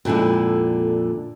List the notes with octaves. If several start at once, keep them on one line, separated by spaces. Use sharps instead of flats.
F2 A#2 D3 G#3 E4